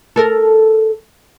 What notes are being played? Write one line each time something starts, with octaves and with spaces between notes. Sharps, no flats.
A4 A#4